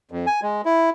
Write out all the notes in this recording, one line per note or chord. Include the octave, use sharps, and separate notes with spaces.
F2
G#5
G#3
E4